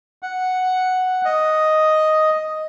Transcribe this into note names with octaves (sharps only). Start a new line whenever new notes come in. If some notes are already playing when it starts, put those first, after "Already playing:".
F#5
D#5